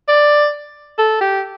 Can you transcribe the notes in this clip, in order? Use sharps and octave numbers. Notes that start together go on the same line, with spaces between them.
D5
A4
G4